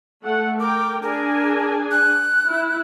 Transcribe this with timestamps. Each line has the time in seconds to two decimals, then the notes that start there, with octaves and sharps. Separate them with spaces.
0.23 A3 F#5
0.60 A#4 G5 D6
1.03 D4 G#4 A#4 G#5
1.91 F#6
2.48 E4